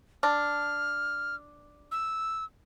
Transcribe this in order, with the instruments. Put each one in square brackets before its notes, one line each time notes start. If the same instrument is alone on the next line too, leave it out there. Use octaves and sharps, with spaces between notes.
[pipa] D4 [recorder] F6
[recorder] E6